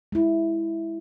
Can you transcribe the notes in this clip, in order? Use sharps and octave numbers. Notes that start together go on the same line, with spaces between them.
G#3 E4